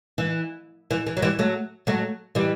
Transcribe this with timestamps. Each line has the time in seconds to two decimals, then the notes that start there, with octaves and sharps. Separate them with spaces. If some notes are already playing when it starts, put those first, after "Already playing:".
0.18 E3
0.91 E3
1.06 E3
1.17 F#3
1.22 E3 G3
1.39 F#3 A3
1.87 F#3 A3
2.35 E3 G3